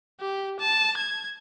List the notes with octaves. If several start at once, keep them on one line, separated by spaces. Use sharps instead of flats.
G4
A5
G#6